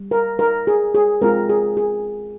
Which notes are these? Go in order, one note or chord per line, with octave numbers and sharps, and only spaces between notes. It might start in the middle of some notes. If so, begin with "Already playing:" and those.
Already playing: G3
A#4
A#4
G#4
G#4
G#3 C4 F4 A#4
G#4
G#4